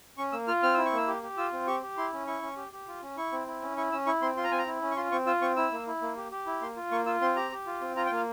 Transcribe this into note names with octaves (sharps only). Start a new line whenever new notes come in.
C#4 C#6
A#3 E6
F4 F6
C4 F6
E4 E6
C#6
A#3 E6
G4
G4
F4 E6
C4
G4 C#6
G4
E4 C6
C#4
E4 C#6
C#4
G4
G4
F4
C#4
E4 C#6
C4
E4
C#4
E4 C#6
C#4 E6
E4 C#6
C4 C6
F4 C6
A#5
C4 G#5
A#5
E4
C#4
C#6
F4 C6
C4 C#6
F4 E6
C4 C#6
E4 E6
A#3
E4
A#3
G4
G4
E4
A#3 C6
F4
A#3 C#6
F4 E6
C4 C6
G4 A#5
G4
F4
C4
F4 A#5
G5
A#3 F5